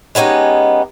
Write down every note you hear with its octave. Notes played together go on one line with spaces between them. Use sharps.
G#3 B3 C#4 D#4 G4